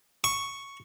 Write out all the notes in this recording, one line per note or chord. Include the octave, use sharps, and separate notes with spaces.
C#6